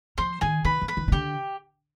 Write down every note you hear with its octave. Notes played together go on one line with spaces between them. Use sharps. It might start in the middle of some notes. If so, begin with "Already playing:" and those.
F3 C5 C6
D#3 G#4 G#5
D#3 B4 B5
F3
B4 B5
D#3
D#3
D3 G4 G5